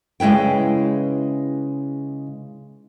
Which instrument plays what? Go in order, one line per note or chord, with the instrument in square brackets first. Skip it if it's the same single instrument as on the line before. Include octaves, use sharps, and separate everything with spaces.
[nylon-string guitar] C#3 G#3 E4 B4 G5